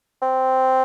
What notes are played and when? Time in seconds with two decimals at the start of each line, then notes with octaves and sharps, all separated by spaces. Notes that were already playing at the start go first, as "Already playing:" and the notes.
0.22 C4